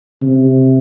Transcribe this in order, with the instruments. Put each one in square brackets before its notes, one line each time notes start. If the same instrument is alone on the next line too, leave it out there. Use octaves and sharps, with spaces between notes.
[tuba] C3